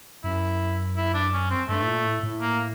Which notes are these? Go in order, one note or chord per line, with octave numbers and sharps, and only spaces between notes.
F#2 E4
E4
D4
C#4
C4
G2 A3
A2
A#2
A2
A2
A#3